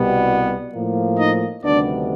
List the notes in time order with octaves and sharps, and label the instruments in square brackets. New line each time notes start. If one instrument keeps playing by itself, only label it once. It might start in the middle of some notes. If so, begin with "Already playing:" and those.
Already playing: [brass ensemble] C2 B2 G3 B3
A2 F3 A#3
D#4 D#5
D2 C3 D#3 G3 B3 D4 D5